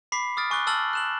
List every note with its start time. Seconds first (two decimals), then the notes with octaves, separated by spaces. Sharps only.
0.12 B5 D6 B6 C7
0.37 D6 D#6 F6 A6 D7
0.51 G#5 C#6 D6 F#6 G7
0.67 A5 E6 F6 A6 F#7
0.93 F#6 E7 F#7